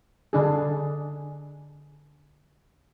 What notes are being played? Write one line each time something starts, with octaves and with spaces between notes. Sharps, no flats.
D3 D4 G#4